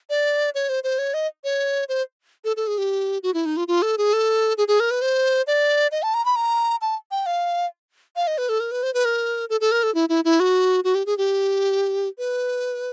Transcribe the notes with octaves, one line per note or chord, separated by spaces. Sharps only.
D5
C#5
C5
C5
C#5
D#5
C#5
C5
A4
A4
G#4
G4
F#4
E4
D#4
F4
F4
A4
G#4
A4
G#4
G#4
A#4
B4
C5
D5
D#5
A5
A#5
B5
A#5
A5
G5
F5
F5
D#5
B4
A4
A#4
B4
C5
B4
A#4
A4
A4
A#4
A4
E4
E4
E4
F#4
F#4
G4
G#4
G4
B4